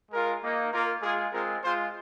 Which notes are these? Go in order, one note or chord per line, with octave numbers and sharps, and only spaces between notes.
G#3 F4 A#4
A#3 D#4
A#3 F4 A#4
G#3 F4 G#4
G#3 C4 F4 A#4
G#3 F4 C5